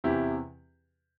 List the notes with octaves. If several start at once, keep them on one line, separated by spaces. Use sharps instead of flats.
E2 C3 E3 E4 G4